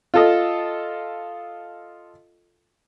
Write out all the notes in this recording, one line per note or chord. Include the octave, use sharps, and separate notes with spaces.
F4 A4 D#5